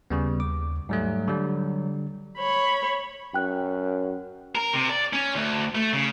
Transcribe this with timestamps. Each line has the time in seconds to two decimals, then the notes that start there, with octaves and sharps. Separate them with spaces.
0.10 D#2 C#3 G3 B3
0.40 D6
0.89 G#2 F#3 G3 A3
1.28 D3 G3
2.38 C#5 B5
3.34 F#2 G5 F#6
4.55 A#4
4.73 C3
4.89 D5
5.13 C#4
5.35 D2
5.75 A3
5.93 C#3